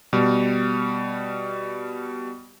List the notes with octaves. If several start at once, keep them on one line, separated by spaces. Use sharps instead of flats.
B2 G3